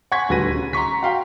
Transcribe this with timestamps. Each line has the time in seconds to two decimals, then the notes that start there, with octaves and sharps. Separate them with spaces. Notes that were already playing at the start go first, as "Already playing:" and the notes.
0.12 F#5 G#5 C6 C#6 G#6 B6
0.29 D#1 D2 F#4 B4 A#6 D#7
0.55 C#3
0.73 A#5 C6 C#6 B6
1.03 F#4 F5 G5